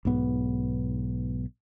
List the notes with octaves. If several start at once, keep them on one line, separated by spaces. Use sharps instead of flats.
B1 G#2 B3